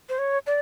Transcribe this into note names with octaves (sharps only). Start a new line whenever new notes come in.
C5
C#5
D5